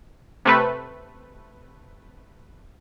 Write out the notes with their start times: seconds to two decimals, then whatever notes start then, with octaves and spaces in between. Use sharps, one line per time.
0.45 C3 A3 B4